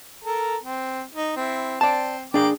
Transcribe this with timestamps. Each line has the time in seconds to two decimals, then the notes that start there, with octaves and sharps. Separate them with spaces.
0.24 A4 A#4 A#5
0.64 C4
1.15 D#4
1.36 C4 E4
1.81 C4 D5 A5
2.34 A#3 D4 G#4 G5 D6